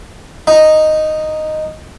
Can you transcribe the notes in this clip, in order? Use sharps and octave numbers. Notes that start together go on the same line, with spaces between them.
D#4